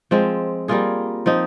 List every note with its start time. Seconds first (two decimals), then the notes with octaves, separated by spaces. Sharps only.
0.11 F3 G#3 C4
0.68 G3 A#3 F4 G#4
1.26 F3 C4 D#4